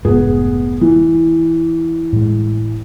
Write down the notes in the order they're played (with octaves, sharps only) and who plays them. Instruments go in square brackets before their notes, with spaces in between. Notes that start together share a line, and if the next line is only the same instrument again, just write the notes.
[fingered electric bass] F1 G#2 A3 [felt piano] B3 G#4
[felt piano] E3
[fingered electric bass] A2 G#3